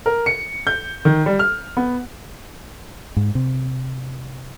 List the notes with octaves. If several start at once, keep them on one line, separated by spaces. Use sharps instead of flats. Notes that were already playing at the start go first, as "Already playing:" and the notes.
A#4
C#7
G6
D#3
G3
F6
B3
G#2
C3